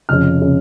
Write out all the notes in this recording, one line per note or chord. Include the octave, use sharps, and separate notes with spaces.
F1 F2 C#3 F6
C#3